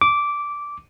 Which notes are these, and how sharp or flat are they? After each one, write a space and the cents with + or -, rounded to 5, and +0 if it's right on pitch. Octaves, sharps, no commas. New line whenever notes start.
D6 -10